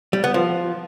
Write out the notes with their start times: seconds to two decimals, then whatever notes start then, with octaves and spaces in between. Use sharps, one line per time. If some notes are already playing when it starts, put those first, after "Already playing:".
0.13 G3
0.24 B3
0.34 F3